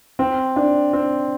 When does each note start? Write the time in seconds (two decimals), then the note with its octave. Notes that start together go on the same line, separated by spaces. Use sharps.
0.19 C4
0.56 D4
0.93 C4